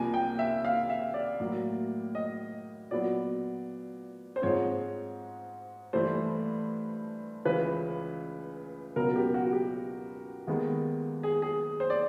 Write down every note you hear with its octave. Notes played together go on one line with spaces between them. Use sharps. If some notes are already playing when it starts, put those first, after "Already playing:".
Already playing: C2 C3 F3 A#3 G#5
G5
E5
F5
E5
D5
A2 F#3 A#3
D#5
A#2 F#3 B3 D5
C5
G#2 F3 G#3 C4 C#5
G2 E3 A3 C5
C#2 C#3 E3 B4
C#2 B2 F#3 B3 A#4
G4
F#4
G4
D#2 D#3 G#3 B3
G#4
G#4
C5
D5